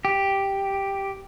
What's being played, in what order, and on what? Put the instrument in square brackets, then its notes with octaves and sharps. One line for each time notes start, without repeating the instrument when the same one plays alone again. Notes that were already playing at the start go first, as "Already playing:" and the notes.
[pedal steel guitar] G4